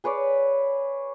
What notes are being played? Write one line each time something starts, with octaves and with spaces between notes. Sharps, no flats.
G#4 B4 C#5 D5